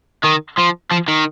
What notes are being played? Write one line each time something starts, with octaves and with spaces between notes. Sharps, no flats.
D#3
F3
F3
D#3